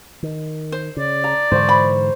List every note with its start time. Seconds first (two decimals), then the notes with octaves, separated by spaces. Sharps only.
0.23 D#3
0.72 C5
0.97 C#3 D5
1.24 A#5
1.51 G#2 D3 E3 C5 C#6
1.69 B5